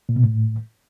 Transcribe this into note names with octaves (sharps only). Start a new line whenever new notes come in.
A#2
B2
A2